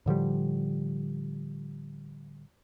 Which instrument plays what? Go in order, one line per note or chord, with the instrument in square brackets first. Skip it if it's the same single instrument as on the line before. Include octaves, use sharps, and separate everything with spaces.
[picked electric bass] A2 D3 F3 G3